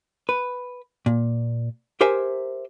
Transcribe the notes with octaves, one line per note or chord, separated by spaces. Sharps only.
B4
A#2
G4 A#4 C5 E5 G#5